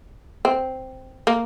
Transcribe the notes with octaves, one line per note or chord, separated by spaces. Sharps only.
C4
A#3